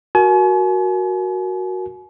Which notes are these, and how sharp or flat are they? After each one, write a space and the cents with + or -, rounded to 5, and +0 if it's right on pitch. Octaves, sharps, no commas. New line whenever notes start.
F#4 +0 A#4 +10 G#5 +40